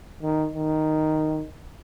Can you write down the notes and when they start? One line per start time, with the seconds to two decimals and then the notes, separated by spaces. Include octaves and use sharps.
0.23 D#3
0.54 D#3